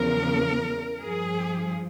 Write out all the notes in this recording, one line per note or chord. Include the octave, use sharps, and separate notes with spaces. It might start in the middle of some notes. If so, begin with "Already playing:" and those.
Already playing: E2 C#3 F3 A#4
G2 F3 G#4